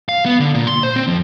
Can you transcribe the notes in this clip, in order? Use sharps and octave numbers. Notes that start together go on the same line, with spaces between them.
F5
B3
D3
A#2
C6
C5
C4
F2